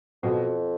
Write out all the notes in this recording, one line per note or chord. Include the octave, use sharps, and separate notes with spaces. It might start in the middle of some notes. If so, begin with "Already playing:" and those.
F2 B2